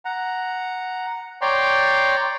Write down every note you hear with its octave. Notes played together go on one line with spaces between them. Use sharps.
F#5 A#5
C#5 D5 G5 A#5 C6